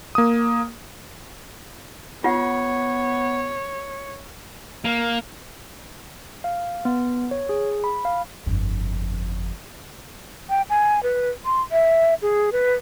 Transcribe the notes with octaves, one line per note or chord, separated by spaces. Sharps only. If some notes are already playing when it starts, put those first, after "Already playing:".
A#3 D#6
B3 F4 C#5 F#5
A#3
F5
B3
C#5
G#4
B5
F5
G1 F2
G5
G#5
B4
C6
E5
G#4
B4